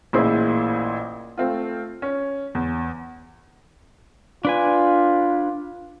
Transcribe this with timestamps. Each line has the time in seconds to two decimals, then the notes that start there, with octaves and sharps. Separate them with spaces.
0.13 A1 A#2 E4 G#4 C5
1.38 A3 C4 F4
2.02 C#4
2.55 E2
4.45 D4 F4 B4 G#5